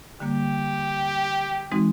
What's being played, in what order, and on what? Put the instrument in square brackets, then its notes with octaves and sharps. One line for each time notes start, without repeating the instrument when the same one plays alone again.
[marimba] D3 G3 A#3 [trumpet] G4
[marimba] E3 G#3 C4 D#4 F#4